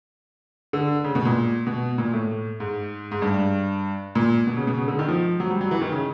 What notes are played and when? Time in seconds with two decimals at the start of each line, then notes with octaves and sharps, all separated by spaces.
0.73 D3
1.04 C#3
1.15 B2
1.25 A#2
1.67 B2
1.98 A#2
2.13 A2
2.60 G#2
3.11 G#2
3.22 G2
4.15 A#2
4.47 B2
4.57 C#3
4.67 B2
4.78 C#3
4.88 D3
4.99 D#3
5.08 F3
5.40 F#3
5.51 G3
5.61 F#3
5.71 E3
5.82 D#3
5.92 C#3